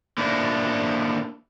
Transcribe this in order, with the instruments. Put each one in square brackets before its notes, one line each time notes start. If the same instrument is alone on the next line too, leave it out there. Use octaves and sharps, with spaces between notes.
[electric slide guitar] A#3 D4 E4